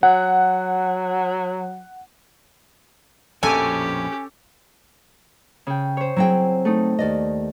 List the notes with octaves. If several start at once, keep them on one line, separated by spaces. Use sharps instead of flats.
F#3 F#5
A#1 F2 B2 C#4 G4 A4 G#5
C#3 G5
C5 C#5
F#3 C4 E4 G#4 G5
A3 D#4
D#2 D5 D#5